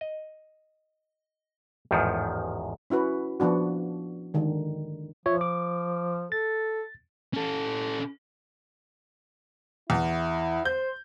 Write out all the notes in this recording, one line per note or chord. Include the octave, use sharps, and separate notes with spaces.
D#5
A1 E2 G#2 D#3 F3
C#4 E4 F#4 B4
F3 B3 D4 F#4
D3 D#3 G#3
F3 F4 C#5 E5
D6
A4 A6
C#4 A4
E2 E4
C5 G6